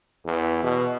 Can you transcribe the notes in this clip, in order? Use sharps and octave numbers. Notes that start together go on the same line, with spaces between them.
E2
B2